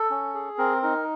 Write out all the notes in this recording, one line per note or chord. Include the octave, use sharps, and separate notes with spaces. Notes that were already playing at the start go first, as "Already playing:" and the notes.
Already playing: A4
C#4
G#4
C4 A#4
D#4 A#4